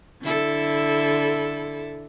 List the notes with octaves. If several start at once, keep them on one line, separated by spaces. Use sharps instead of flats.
D3 E4 A4